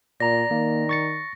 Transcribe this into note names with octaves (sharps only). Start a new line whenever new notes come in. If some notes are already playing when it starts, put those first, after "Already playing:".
A#2 D5 A#5 A#6
D#3 A#3
C#6 A6 C#7